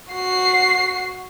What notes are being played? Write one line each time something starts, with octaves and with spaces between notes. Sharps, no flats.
F#4 C7